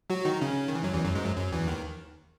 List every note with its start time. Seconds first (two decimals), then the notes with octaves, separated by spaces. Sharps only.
0.10 F#3 F#4
0.25 D#3 D#4
0.41 C#3 C#4
0.68 D#3
0.75 E3
0.83 F#2 F#3
0.94 E2 E3
1.05 F#2 F#3
1.15 G#2 G#3
1.25 F#2 F#3
1.36 F#2 F#3
1.52 E2 E3
1.67 D#2 D#3